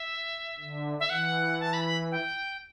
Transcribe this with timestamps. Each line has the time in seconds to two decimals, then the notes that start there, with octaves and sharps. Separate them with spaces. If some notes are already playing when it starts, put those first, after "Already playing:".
Already playing: E5
0.59 D3
1.00 E5
1.10 E3 F#5
1.60 A5
1.73 B5
1.85 B5
2.11 G5